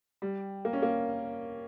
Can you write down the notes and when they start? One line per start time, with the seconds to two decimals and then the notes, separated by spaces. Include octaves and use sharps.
0.22 G3
0.65 A#3
0.73 C#4
0.82 A#3